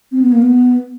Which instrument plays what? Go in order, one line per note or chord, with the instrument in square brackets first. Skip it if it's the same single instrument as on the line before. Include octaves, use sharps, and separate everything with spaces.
[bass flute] C4
B3
A#3
B3